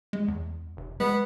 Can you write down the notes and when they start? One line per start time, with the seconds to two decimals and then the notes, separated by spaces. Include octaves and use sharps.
0.13 G#3
0.28 E2
0.77 F1
1.00 G#3 B3